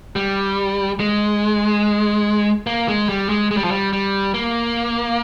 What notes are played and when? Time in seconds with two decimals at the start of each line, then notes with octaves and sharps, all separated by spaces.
0.16 G3
1.00 G#3
2.67 A#3
2.88 G#3
3.09 G3
3.29 G#3
3.51 G#3
3.57 G3
3.64 F3
3.71 G3
3.93 G3
4.34 A#3